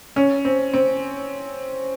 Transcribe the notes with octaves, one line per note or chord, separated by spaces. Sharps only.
C#4
C4
C4